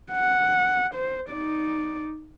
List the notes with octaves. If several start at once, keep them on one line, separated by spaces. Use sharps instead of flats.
F#5
C5
D#4 D5